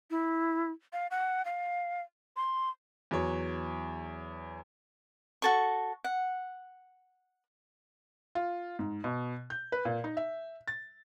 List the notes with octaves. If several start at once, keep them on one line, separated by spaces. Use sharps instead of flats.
E4
F5
F#5
F5
C6
E2 F#3 C#5
F#4 A4 C#6
F#5
F4
G#2
B2
G6
B4
A#2
D#4
E5
A6